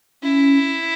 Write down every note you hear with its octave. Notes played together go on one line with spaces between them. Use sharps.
C#4 E4